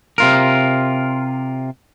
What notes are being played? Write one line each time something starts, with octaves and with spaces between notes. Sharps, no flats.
C3 F4 A#4